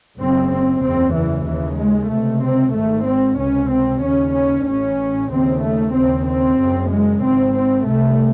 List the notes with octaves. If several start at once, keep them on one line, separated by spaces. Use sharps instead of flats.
F#1 F#2 C#3 C4
C4
F#1 E2 C#3 C4
E3
D#2 C#3 E3
G#3
C#2 C3 A3
C4
G#1 G#2 A3
C4
C#2 C3 C#4
C4
D#2 C#3 C#4
C#4
A1 A2 C#4
D#2 C#3 C4
A3
D#2 C#3 C4
C4
F#1 F#2 C#3
G#3
G#1 G#2 C4
C4
C2 C3 A3